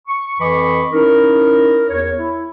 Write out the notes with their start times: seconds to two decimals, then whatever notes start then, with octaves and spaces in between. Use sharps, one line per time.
0.08 C#6
0.40 F2 E3 D#5 B5 C#6 D6
0.93 C#4 D#4 E4 A#4
1.90 E2 C#5
2.18 E4